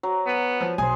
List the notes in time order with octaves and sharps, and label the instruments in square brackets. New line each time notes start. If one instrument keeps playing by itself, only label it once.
[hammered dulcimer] F#3
[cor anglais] B3
[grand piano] F3
[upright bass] B1 [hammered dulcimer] G#4 C5 [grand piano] G#5